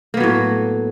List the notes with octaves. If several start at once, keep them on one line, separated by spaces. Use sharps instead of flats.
A2 F#3 A#3 B3